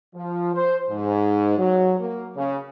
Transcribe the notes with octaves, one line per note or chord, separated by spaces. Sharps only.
F3
C5
G#2
F#3
A#3
C#3